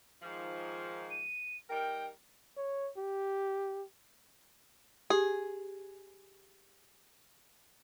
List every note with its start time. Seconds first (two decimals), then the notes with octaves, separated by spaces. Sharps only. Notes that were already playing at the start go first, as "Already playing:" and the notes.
0.22 G#2 D#3 F3
1.11 D#7
1.70 G3 D#4 A#4 G5
2.57 C#5
2.97 G4
5.10 G4 G#4